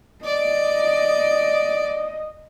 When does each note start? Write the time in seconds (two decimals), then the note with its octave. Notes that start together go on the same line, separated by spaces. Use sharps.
0.25 D5 D#5